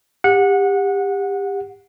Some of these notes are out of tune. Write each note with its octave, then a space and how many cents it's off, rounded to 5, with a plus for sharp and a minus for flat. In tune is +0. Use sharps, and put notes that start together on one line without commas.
G4 +25 F#5 -20